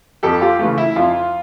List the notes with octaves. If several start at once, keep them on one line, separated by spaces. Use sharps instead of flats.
F2 G4 A4
F4 G4
C#3 E3 A3
E4
F2 F4